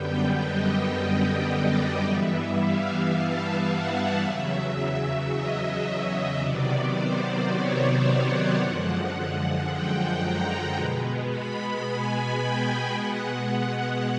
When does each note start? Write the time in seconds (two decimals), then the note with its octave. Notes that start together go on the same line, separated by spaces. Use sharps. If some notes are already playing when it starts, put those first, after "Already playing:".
Already playing: F#2 D3 G3 B3 G5
0.40 D#5
1.48 D5
2.03 G2 E3 G3 B3 E5
2.58 F5
3.11 A5
3.66 F#5
4.20 E2 C#3 F#3 E5
5.30 D#5
6.39 C3 D#3 F#3 B3 D5
6.93 C5
7.47 C#5
8.02 F#5
8.56 F#2 D3 F3 G#3 F#5
9.65 G5
10.20 A#5
10.75 B2 G#3 B3
11.28 B5
11.83 G#5
12.37 G5
12.92 B2 G#3 B3 F#5